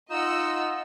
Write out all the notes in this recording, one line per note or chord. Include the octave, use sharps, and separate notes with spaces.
D#4 F4 D#5 F#5 E6